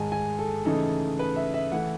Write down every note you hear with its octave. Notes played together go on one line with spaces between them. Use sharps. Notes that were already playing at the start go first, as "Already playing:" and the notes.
Already playing: G#2 D#3 G#3 D#4 G#5 A5
G#5
A4
C#3 E3 A3 D#4 A4
B4
E5
E5
E3 A3 F#5